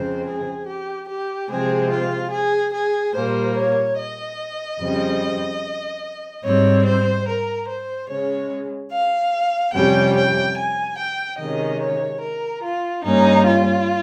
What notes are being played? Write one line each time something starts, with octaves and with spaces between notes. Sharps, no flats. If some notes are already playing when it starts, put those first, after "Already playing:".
Already playing: F2 C#3 G#3 C4 C5
G#4
G4
G4
C3 F3 G#3 C4 G#4
F4
G#4
G#4
A#2 G3 A#3 C5
C#5
D#5
F2 C#3 G3 C4
G#2 G3 C4 C#5
C5
A#4
C5
C#3 G#3 C#4 C#5
F5
F2 C3 G3 C#4 G5
G5
G#5
G5
C3 D#3 G#3 C#4 D#5
C#5
A#4
F4
G2 G3 A#3 C#4 D#4
F4